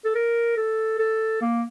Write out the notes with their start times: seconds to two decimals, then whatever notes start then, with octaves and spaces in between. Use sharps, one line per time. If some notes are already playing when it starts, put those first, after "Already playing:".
0.05 A4
0.15 A#4
0.57 A4
0.99 A4
1.41 A#3